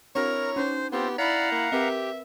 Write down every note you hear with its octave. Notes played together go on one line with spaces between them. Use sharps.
C4 D4 E4 F#4 A#4 C#5 A#5
C#4 D#4 C5
B3 C4 F4 G4 C5
E4 D5 F5 F#5 A#5 B5 B6
A#3
C4 G4 A#4 B4 E5